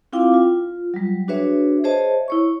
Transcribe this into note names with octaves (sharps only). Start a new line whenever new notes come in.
C4 E4 F4 F5 G5 D6
F4
F#3 G3
D4 F#4 G#4 B4 C#5 E5
G#4 C5 C#5 D#5 E5 A5
E4 C#5 C#6